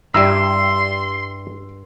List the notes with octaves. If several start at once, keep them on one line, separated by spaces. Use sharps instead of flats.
G2 G3 E4 A#5 C6 E6